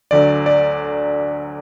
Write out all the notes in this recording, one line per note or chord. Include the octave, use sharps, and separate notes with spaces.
D2 D3 F#3 D5
D5